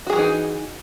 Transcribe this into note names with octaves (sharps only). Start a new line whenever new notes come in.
E3 F#3 D#4 F#4 G#4